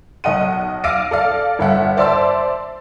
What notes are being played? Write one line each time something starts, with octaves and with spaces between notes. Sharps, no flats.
B1 D#5 F#5 D#7
F5 D6 E6 A#6 D7 D#7
A4 D5 F5
G1 E5 F#5
C5 D5 E5 A5 C6 E6